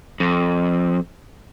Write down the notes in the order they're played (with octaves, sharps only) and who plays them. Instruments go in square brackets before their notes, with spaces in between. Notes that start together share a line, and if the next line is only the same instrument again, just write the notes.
[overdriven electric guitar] F2